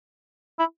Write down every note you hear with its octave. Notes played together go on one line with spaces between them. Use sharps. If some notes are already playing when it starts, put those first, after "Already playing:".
E4